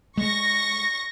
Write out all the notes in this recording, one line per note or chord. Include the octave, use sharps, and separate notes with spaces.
G#3 C#6 A#6